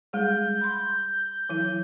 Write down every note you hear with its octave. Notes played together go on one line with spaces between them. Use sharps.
G3 G#3 G#4 G6
B5 C6
E3 F#3 E4